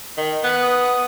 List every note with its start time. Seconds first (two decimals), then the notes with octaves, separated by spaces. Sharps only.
0.17 D#3
0.44 B3 F#6
0.61 D#6